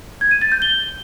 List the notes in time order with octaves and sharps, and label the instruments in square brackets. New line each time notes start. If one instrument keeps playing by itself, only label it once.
[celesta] G#6
D#7
A6
G6
G7